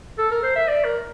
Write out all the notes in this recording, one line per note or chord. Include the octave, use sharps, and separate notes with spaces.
A4
A#4
C5
E5
D5
A#4